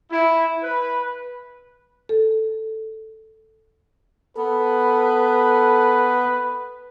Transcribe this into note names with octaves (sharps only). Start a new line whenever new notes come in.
E4
B4
A4
B3 A4 B4